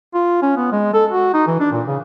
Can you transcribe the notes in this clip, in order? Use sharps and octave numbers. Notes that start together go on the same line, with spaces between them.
F4
C#4
B3
G#3
A4
F#4
D#4
E3
D4
A#2
C#3